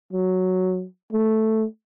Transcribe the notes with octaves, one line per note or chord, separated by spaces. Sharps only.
F#3
A3